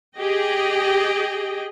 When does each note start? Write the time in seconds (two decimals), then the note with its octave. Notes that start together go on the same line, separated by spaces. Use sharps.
0.18 G4 G#4 D#5 G5